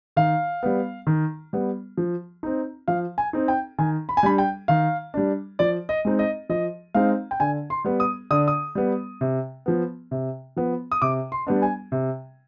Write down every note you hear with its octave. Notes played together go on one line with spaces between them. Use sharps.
D#3 F5
G3 B3
D#3
G3 B3
F3
C4 D#4
F3 F5
G#5
C4 D#4
G5
D#3 G#5
B5
G#5
G3 D4 B5
G5
D#3 F5
G3 D4
F3 D5
D#5
G#3 C4 D#4
D#5
F3 D#5
G#3 C4 D#4 F5
G5
D3 G#5
C6
G3 B3
D#6
D3 D#6
D#6
G3 B3
C3
F3 B3
C3
F3 B3
D#6
C3 D6
C6
G3 B3 D4
G#5
C3